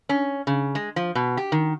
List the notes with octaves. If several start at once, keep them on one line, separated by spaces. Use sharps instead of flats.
C#4
C#3
G#3
F3
B2
G4
D#3